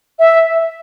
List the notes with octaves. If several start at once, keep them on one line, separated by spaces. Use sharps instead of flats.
E5